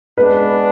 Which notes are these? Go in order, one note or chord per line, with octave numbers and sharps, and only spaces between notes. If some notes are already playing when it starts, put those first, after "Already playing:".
G#3 B3 D4 B4